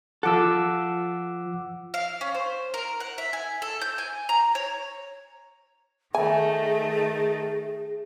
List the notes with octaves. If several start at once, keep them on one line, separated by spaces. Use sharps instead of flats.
F3 A4 F#5 D6 E6
F5
C#4
C5
A#4
F#5
E5
G#5
A4
G6
G#5
A#5
C#5
D#3 A3 G#4 E5 G#5